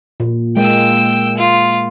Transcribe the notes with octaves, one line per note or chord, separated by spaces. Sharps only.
A#2
G#3 A#3 G5 E6
F4